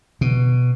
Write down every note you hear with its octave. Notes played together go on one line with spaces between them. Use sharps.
B2